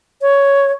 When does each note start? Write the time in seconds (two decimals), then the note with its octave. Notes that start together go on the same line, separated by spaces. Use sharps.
0.22 C#5